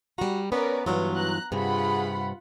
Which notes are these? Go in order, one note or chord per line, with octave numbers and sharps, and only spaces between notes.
G3 F#4 A#5
B3 C#4 A#4 B4 C#5 D5
G2 E3 F#3 B3 F4
A#5 F#6
G2 C3 F4 G#4 F#5 B5